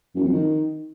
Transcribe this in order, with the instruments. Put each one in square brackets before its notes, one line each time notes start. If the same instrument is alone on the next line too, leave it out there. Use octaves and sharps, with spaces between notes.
[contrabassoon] F#2
F2
D#3